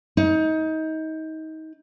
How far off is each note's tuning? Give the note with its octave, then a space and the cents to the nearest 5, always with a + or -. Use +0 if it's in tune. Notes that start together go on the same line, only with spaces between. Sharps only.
D#4 +25